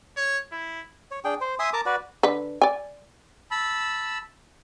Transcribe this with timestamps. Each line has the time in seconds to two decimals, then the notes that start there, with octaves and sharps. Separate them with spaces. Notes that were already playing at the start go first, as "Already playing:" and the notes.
0.16 C#5
0.52 E4
1.11 C#5
1.24 D4 G#4 G5
1.41 C5
1.59 E5 G#5 C6 D#6
1.73 A#4 A5 A#5 D6
1.86 F#4 B4 D5
2.23 D3 B4
2.62 D5 G#5
3.51 A5 B5 E6